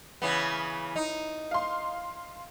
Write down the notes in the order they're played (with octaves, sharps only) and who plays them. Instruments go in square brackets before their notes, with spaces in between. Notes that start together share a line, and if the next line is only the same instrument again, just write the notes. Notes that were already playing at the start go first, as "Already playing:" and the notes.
[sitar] C#3 E3 B3
D#4
[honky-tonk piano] F5 C6